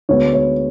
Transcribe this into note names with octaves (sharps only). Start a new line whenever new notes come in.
D2 D3 G#3 B3 C#5
C#5